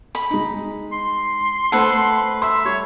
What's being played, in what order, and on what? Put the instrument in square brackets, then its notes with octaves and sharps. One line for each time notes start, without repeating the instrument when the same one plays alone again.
[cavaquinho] B5
[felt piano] G#3 D#4
[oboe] C6
[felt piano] A3 C5 F#5 [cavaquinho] A4 B4
[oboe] E5 [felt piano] C6
[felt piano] G3 [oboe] C#5